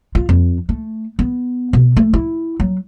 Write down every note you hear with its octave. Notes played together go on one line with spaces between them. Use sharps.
F4
F2
A3
B3
B2
A3
E4
F#3